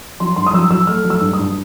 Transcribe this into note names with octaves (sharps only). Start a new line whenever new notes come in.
F#3 C6
G2 C6
D#6
F#3 E6
F#3 E6
A3 F6
F#3
E6
G2
D#6
G2